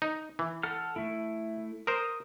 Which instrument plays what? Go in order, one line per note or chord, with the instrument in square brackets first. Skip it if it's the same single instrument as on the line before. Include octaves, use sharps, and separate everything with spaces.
[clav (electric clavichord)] D#4
E3
[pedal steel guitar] A4 F#5 F6
A3 E4
[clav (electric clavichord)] A#4 C5 [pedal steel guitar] D#6